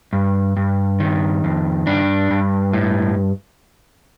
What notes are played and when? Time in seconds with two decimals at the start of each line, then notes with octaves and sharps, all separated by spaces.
0.13 G2
0.57 G2
1.00 D#3
1.44 F2
1.87 G2 D4
2.31 G2
2.73 A2